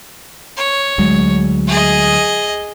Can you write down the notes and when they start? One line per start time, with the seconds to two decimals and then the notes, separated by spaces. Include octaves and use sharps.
0.57 C#5
0.98 D2 F#3 G#3
1.67 G#4 D#5